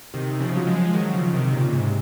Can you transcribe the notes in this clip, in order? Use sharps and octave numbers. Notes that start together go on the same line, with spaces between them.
C3 D#3
C#3 F3
F#3
F3 G#3
D#3 F#3
C#3 F3
C3 D#3
A#2 C#3
G#2 C3